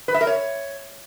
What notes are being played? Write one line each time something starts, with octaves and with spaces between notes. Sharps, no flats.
B4
E5
A#4
C#5